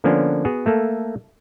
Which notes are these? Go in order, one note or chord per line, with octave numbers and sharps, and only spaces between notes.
D3 F3 A#3 B3 C#4 D4
B3 F#4 G#4
A3 A#3 A4